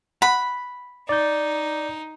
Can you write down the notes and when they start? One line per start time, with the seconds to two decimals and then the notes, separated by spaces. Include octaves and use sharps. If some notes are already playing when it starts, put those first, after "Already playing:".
0.22 F#5 B5
1.09 D#4 D5 G6